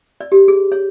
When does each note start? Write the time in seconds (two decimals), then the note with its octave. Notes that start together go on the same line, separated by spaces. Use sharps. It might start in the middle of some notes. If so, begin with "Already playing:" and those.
0.20 D5
0.32 G4
0.48 G#4
0.72 C#5